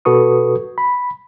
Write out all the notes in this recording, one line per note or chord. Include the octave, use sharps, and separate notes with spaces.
B2 F#4 A4 B4 C#6 D#6
B5